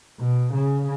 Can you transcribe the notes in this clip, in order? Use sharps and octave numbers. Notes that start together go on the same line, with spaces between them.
B2
C#3